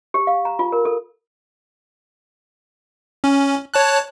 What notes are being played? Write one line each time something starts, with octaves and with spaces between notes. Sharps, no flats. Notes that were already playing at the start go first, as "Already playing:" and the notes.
G4
F5
A#5
F4
A#4
A4
C#4
C#5 A5 F#6